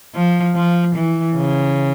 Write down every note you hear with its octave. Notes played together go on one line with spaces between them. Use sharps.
F3
F3
E3
C#3